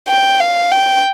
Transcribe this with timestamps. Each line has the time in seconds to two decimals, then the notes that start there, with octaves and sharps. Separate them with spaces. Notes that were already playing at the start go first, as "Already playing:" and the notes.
0.08 G5
0.40 F5
0.72 G5